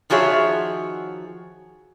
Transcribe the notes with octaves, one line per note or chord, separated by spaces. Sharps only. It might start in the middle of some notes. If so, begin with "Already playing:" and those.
D#3 F3 F#4 G#4 C#5 E5